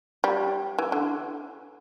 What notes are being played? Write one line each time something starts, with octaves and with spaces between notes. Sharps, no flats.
G3
E3
D3